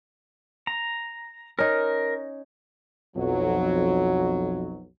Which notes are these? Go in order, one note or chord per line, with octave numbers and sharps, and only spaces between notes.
A#5
C#4 D#4 A#4
B1 F2 F#3